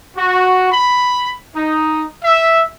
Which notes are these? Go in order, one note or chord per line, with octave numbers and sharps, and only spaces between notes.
F#4
B5
D#4
E5